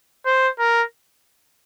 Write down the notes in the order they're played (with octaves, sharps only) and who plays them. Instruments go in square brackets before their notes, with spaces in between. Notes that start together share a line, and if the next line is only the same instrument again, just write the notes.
[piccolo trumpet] C5
A#4